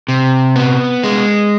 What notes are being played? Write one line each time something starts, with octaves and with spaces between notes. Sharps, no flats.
C3
B3
G#3